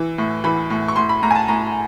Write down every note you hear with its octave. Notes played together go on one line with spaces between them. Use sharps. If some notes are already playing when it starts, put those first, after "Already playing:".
Already playing: E3
A2
E3 B5
A2
C#6
A2 C6
B5
A2 A#5
G#5
A5
A2 A#5